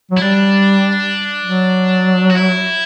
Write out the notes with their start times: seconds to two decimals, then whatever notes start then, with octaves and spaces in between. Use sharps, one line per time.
0.11 F#3
0.17 E4
0.21 G3 D4
1.43 F#3
2.30 F#4
2.35 E4